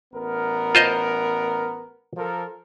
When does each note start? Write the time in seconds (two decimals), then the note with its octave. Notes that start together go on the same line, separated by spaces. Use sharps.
0.14 A1 B3 A#4
0.75 F4 C5 D#5
2.17 F3 A4 A#4